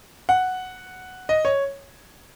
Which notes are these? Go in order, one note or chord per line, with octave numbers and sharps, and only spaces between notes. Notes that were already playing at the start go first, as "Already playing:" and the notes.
F#5
D#5
C#5